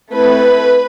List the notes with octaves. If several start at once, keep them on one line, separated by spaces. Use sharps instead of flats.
A3 C4 E4 B4